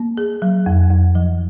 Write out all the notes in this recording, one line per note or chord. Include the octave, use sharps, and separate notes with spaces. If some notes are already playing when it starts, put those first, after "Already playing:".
Already playing: A#3
G#4
F#3
F2
F2
F3